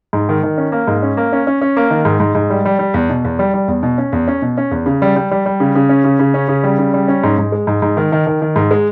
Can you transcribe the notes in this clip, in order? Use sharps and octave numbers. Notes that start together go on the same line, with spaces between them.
G#2
D#3
D#3
C#4
A#3
G#2
C#4
A#3
C#4
C#4
C#4
A#3
D#3
G#2
G#2
G#2
G3
G3
G3
E2
B2
E2
G3
G3
E2
B2
C#4
E2
C#4
B2
C#4
E2
C#3
G3
G3
G3
G3
C#3
C#3
C#4
C#3
C#3
C#4
C#3
G3
C#3
G3
C#4
G#2
G#2
G#3
G#2
G#2
D#3
D#3
D#3
D#3
G#2
G#3